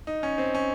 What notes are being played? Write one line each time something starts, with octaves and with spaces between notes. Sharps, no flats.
D#4
C#4
C4
C#4